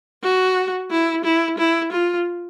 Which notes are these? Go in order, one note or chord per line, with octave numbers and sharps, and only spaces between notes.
F#4
E4
E4
E4
F4